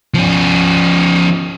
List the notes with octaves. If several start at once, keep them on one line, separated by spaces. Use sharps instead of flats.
F3 C#4